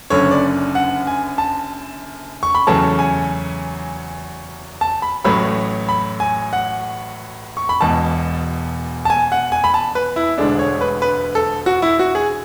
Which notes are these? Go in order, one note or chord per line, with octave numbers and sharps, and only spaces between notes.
F#1 F#2 D3 C#5
D5
F#5
G#5
A5
C#6
B5
E2 C#3 F#3 A3 A5
G#5
A5
B5
A1 A2 F#3 A3 B5
B5
G#5
F#5
C#6
B5
E1 E2 B2 A5
A5
G#5
F#5
G#5
B5
A5
B4
E4
E1 D2 D3 G#3 D4
C#5
B4
B4
A4
F#4
E4
F#4
G#4